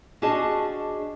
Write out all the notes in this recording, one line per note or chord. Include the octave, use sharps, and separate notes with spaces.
C#4 D4 F#4 G#4 D#5 A5